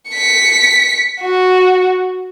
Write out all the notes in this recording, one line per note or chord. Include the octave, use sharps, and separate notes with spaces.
B6 C#7
F#4